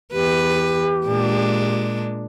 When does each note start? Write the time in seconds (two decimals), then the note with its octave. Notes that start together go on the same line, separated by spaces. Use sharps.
0.12 E2 G4 B4
1.06 A#2 G#3 D4